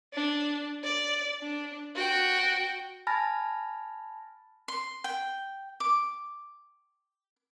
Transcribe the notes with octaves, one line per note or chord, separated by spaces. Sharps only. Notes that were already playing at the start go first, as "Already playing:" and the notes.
D4
D5
D4
F#4 G5
G#5 A5 B5 F6 A6 A#6
C6
G5
D6